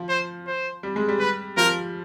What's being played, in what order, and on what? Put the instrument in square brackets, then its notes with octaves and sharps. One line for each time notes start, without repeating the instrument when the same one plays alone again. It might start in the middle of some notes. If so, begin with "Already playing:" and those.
Already playing: [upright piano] F3
[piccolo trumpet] C5
C5
[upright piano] G3
G#3
G3
[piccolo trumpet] B4
[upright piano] F3 [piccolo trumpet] A#4